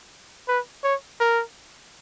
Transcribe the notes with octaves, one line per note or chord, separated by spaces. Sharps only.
B4
C#5
A#4